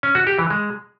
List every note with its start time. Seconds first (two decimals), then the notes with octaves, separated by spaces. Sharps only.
0.03 C#4
0.15 F#4
0.27 G4
0.39 E3
0.50 G#3